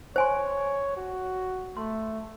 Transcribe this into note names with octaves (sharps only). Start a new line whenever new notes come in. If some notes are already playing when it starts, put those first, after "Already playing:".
C5 C#5 G#5 C6
F#4
A3 C6